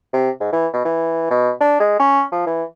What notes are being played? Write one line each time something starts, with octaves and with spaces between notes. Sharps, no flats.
C3
G#2
E3
B2
E3
B2
D4
G#3
C#4
F3
E3